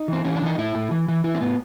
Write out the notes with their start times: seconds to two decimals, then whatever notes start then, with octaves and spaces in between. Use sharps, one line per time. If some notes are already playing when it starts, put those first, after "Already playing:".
Already playing: D#4
0.08 E3 C4
0.25 E3 C#4
0.36 D4
0.42 E3 D#4
0.58 A2 E4
0.75 A2
0.91 E3
1.08 E3
1.24 E3 E4
1.34 C4
1.41 A2 B3